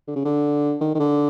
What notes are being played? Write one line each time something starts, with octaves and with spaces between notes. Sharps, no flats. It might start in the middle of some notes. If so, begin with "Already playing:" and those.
D3
C#3
D3
D#3
D#3
D3